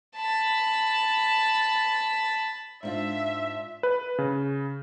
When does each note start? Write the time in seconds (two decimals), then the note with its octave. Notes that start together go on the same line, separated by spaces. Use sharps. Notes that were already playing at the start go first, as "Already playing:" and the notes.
0.17 A5 B5
2.83 G#2 D4 F4 E5
3.83 B4
4.18 C#3